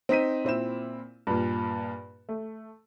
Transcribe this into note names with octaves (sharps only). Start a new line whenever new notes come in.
C4 D#4 B6 D#7
A#2 C4 E4 E7
G2 A#2
A3